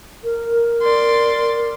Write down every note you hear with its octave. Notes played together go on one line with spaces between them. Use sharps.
A#4
D5 C6